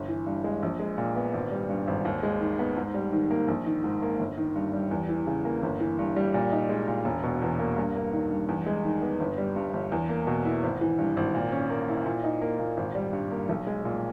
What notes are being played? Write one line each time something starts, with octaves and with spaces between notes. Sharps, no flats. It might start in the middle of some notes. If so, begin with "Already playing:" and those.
Already playing: G1
E3
G2
G#3
A#1
G#3
A#2
B3
G#1
G3
G2
G#1
D#2
G#3
D#3
B3
G#2
G3
D#3
A#3
A#1
D#3
G#2
A#3
G1
D#3
G2
G3
E2
E3
C#3
A#3
G1
E3
G2
G3
A#2
D#4
G#3
A#2
E1
B2
E2
A#3
G2
A#3
D#3
G2
E2
G#3
D#3
B3
G1
G3
G2
G1
E2
A#3
B2
E4
G#1
E3
G2
G#1
A#2
C#4
A#3
E4
A#2
D#4
A#3
A#2
G#1
G3
G2
A#3
B1
G#3
A#2